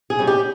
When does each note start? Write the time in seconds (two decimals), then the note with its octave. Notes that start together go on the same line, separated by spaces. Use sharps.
0.10 G#4
0.19 G3 C#4
0.27 G4